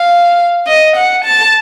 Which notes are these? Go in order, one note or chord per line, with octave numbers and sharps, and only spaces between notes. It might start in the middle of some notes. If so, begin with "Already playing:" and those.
Already playing: F5
D#5
F#5
A5